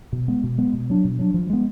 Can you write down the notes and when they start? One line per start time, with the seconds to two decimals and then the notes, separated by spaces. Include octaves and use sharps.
0.13 B2
0.28 G#3 B3
0.44 B2
0.58 G#3 B3
0.73 B2
0.90 F#3 D4
1.05 B2
1.19 F#3 D4
1.34 F3
1.50 G#3 B3